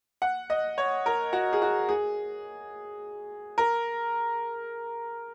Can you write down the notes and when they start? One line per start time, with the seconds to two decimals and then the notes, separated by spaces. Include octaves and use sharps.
0.22 F#5
0.50 D#5
0.78 C#5
1.06 A#4
1.33 F#4
1.53 G#4
1.62 F#4
1.89 G#4
3.58 A#4